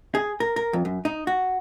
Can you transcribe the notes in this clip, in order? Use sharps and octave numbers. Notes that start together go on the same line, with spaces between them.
G#4
A#4
A#4
F2
F#2
D#4
F#4